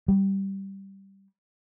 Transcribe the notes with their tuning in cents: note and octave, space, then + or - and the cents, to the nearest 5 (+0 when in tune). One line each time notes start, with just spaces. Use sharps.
G3 -10